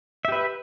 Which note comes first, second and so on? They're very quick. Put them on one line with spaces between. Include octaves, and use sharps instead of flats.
E5 G4 B4